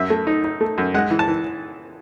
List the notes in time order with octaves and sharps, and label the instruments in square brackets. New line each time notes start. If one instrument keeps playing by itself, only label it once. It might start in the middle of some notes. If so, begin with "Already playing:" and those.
Already playing: [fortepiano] F#2 E5
A3
D#4
D#4
A3
F#2
G#3 F#5
E3
A5
E3